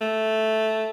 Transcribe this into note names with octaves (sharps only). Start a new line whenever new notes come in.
A3